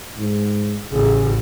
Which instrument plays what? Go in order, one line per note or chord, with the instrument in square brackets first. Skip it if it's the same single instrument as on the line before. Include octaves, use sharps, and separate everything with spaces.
[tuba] G#2
[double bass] A1 [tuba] C#3 [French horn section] G#4